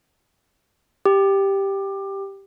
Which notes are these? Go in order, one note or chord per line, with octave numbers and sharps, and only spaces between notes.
G4